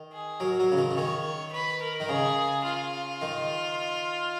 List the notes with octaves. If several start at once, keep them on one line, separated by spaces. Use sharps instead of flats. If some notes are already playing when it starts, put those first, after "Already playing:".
Already playing: D#3
G#4
F#3 A#4
F#3
C#3
D#3
C#3
D#3 C#5
B4
A#4
D#3
C#3 G#4
F4
D#3